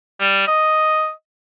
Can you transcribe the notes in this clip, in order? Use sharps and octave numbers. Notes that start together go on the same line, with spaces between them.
G3
D#5